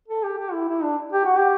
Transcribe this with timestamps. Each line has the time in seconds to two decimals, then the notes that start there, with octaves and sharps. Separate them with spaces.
0.08 A4
0.23 G4
0.38 G4
0.52 E4
0.69 E4
0.83 D4
1.13 G4
1.25 F#4
1.39 G4